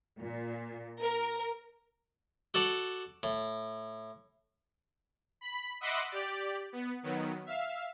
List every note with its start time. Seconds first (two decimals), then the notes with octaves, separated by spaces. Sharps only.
0.20 A#2
1.02 A#4
2.54 F#4 A4 D5 A5
3.23 A2
5.41 B5
5.81 D#5 E5 F#5 B5 C6 D6
6.11 G4 D5
6.73 B3
7.03 D#3 F#3 B3
7.46 E5 F5